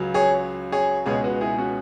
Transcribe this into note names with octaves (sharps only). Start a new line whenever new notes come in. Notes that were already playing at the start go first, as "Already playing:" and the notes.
Already playing: C#2 C#3 F#3
G#4 C#5
G#4 C#5
C#2 B2 G#3 G#4 C#5
F#4 B4
E4 G#4
C#4 F#4